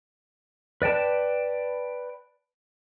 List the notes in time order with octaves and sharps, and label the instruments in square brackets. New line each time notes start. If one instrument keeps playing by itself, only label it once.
[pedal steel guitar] B4 D5 G5 A5